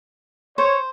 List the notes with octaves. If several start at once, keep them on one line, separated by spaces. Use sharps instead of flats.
C5 C#5